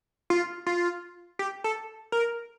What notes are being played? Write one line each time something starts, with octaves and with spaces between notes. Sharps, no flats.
F4
F4
G4
A4
A#4